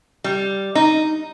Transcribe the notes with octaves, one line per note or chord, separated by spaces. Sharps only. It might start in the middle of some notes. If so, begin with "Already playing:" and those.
G3
D#4